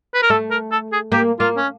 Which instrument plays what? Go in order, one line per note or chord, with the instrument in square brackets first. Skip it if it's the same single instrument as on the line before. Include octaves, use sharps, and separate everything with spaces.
[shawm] B4
A#4
[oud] A3 [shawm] A4
[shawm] A#4
A4
G#4
[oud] A#3 [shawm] G4
[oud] A#3 [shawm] F4
[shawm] C#4